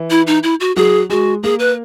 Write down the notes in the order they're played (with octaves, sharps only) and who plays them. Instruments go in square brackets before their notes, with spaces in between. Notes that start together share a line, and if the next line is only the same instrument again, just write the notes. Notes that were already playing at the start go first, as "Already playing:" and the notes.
Already playing: [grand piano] E3
[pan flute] E4
D#4
E4
F#4
[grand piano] F#3 F#4 [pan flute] G#4
[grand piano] G#3 G#4 [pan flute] F#4
[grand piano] A#3 A#4 [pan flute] G#4
[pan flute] B4